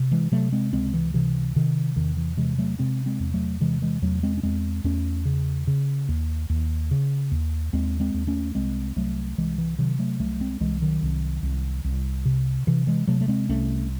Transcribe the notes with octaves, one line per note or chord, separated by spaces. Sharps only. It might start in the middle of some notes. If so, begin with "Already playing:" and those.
Already playing: C3
E3 G#3
C3 F#3 A3
G#3 C4
C#2 G#3 C4
E3
C3 E3
C3 D#3
E2 D#3
E3
C3 E3 G#3
F#3 A3
C3 G#3 C4
G#3 C4
E2
F#3 A3
C3 E3 G#3
E3 G#3
E2 F#3 A3
G#3 C4
C#4
E2 G#3 C4
E2 A3 C#4
C#3
C#3
D#2
D#2
C#3
D#2
D#2 G#3 C4
G#3 C4
D#2
A3 C#4
C2 G#3 C4
C2 F#3 A3
C2 E3 G#3
E3
C3 D#3 F#3
F#3 A3
C2 F#3 A3
G#3 C4
C2 E3 G#3
D#3 F#3
C2
C2
C2
C3
C3 E3
E3 G#3
C3 F#3 A3
A3
G#3 C4
C2 A3 C#4